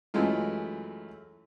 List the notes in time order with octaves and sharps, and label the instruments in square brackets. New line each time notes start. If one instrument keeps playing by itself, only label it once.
[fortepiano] F#2 E3 G#3 A3 F4